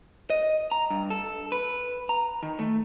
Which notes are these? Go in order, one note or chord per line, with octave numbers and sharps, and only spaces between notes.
D#5
A#5
G2
A4
B4
A#5
D#3
A3